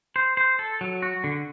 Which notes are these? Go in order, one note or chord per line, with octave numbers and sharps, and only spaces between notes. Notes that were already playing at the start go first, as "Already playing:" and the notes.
C5
C5
A4
F#3
F#4
D3